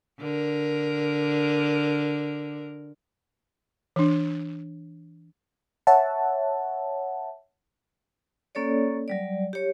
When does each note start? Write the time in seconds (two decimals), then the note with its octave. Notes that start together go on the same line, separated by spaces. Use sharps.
0.19 D3 A#4
3.96 E3 D4
5.87 C#5 E5 F#5 A5
8.55 A#3 C#4 A4 C#5 D5
9.08 F#3 G3 D5
9.53 G4 C#5